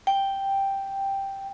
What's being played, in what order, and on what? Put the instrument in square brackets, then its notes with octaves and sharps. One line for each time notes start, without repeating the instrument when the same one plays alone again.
[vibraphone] G5